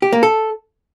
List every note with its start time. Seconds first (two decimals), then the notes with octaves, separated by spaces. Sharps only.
0.02 G4
0.13 A#3
0.23 A4